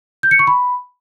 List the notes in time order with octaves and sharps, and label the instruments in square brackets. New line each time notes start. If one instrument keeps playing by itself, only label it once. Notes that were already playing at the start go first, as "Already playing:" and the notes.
[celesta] G6
C#7
C#6
B5